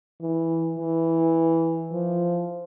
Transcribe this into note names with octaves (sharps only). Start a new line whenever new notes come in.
E3
E3
F3